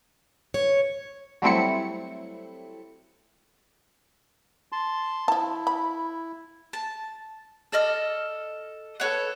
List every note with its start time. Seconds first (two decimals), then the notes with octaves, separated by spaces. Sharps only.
0.54 C#5
1.42 F#3 G3 A3 C4 E4 C#7
4.72 A5 C6
5.28 F3 E4 A5
5.67 B5
6.73 A5
7.72 A4 D5 D#5 F6
9.00 A4 B4 C#5 F#5